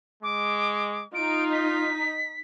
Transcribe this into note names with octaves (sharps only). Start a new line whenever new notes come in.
G#3 D6
D#4 F4 D7
B6